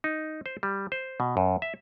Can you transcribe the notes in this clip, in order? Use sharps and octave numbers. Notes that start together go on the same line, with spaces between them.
D#4
C5
G3
C5
B2
F#2
E5